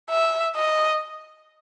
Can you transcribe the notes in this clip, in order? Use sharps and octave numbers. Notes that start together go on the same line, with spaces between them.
E5
D#5